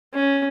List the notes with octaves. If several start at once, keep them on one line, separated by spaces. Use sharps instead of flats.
C#4